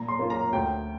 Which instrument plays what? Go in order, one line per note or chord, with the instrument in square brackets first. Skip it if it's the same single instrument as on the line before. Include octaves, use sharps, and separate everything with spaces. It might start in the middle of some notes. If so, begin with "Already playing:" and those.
Already playing: [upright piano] A#2 A#5
C6
A#3 F4
A#5
D2 G5